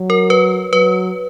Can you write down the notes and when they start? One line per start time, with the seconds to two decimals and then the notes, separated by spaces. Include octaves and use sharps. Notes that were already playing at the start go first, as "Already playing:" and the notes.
Already playing: F#3
0.10 A#4
0.30 B4
0.73 F#3 B4